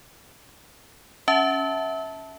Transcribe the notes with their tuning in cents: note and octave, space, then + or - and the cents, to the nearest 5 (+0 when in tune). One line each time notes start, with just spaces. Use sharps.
C#4 +0 E5 -20 A5 +0